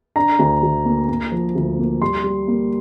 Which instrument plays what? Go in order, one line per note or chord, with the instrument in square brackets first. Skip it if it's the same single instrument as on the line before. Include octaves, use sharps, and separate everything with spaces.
[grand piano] D4 A#5
D2
D2
A#3
A#3
F3
D2
A#3
G3 C6
G3
A#3